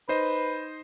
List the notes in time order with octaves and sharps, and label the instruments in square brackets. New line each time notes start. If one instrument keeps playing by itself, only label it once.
[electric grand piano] D#4 C5 D#5 [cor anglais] B4